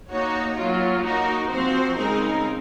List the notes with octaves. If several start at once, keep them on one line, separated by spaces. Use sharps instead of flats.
A#3 D#4 F#4 C#5
F#3 A#3 F4
A#3 D#4 F#4 A#4
F3 C4 F#4 C5
C#3 G#3 C4 D#4 A#4